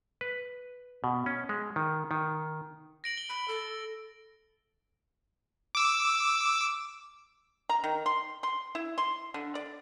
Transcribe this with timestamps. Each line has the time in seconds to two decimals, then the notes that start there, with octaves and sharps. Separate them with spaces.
0.21 B4
1.04 B2
1.26 C#4
1.49 G#3
1.76 D#3
2.11 D#3
3.04 A#6 D7 F#7
3.17 G7
3.29 B5
3.48 A4
5.75 D6 E6
7.69 A#5
7.84 D#3
8.06 C6
8.43 C6
8.75 E4
8.98 C6
9.34 D3
9.55 D5